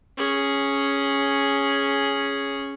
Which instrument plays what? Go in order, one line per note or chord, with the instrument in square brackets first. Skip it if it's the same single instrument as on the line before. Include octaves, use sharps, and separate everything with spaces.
[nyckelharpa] C#4 G#4